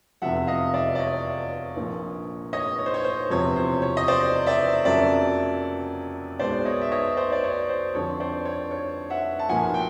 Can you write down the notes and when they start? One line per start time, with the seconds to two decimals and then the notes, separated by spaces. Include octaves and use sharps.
0.22 F1 E2 C3 F3 E5 F#5
0.47 D#5 F5
0.74 D5 E5
0.95 D5
0.99 C#5 D#5
1.76 A#1 A#2 F3
2.53 C#5 D#5
2.79 C#5
2.86 C5
2.94 C#5
3.04 C5
3.30 E1 E2 C3 F3 C#5
3.56 C5
3.82 C#5
3.97 D#5
4.08 C5 D5
4.46 D5 E5
4.85 F2 C#3 F#3 A#3 D5 E5
6.39 B1 B2 G#3 B3 C5 D5
6.65 C#5 D#5
6.81 E5
6.92 C#5 D#5
7.17 C5 D5
7.32 D5
7.44 C#5
7.69 C5
7.94 F2 D3 F3 C#5
8.20 C5 D5
8.45 C#5
8.71 C#5
9.10 E5 F#5
9.39 A5
9.49 B1 A#2 F3 F#5 G#5
9.74 G5